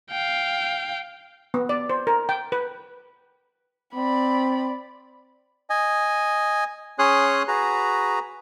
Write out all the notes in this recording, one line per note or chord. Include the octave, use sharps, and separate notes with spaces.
F5 G5
B3
D5
C5
A#4
G5
B4
C4 D5 B5
D#5 G#5
C#4 G#4 C#5 C6 D#6 F#6
F#4 G#4 B4 A#5